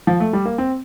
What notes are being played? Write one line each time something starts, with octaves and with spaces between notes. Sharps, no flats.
F3
A3
G3
A#3
C4